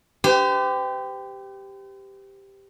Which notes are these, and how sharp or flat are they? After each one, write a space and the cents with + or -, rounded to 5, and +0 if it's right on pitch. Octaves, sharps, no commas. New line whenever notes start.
G4 +0 C5 -45